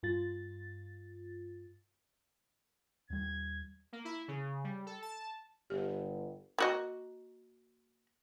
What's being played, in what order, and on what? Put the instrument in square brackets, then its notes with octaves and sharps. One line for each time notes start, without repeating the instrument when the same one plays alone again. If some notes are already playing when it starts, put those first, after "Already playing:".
[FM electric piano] G2 F4 A6
[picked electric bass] D#2 G3 [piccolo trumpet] G#6
[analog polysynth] A#3
E4
C#3
G3
A4
A5
[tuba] G1 [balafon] G4
[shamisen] A#3 F#4 D#5